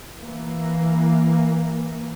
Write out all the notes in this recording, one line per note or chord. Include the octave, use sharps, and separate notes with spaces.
E3 A#3